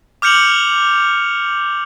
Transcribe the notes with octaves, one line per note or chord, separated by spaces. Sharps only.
D6 F6 G6 C#7 F7 F#7